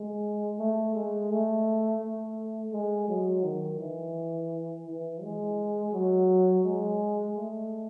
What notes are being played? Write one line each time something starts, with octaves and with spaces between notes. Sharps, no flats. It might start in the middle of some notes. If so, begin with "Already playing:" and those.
Already playing: G#3
A3
G#3
A3
A3
G#3
F#3
D#3
E3
E3
G#3
F#3
G#3
A3